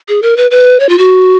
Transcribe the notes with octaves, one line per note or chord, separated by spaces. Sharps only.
G#4
A#4
B4
B4
C#5
F4
F#4